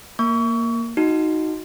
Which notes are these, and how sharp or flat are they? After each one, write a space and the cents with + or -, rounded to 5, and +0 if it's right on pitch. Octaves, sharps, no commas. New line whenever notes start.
A#3 +0 C#6 +30
D#4 +10 F#4 -5